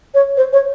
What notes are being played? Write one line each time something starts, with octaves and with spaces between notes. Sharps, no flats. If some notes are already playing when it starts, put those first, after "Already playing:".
C#5
C5
C#5